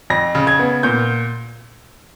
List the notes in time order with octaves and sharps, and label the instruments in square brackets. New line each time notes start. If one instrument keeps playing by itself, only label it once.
[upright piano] F2 A#6
C#3
G#6
B3
A#2 G6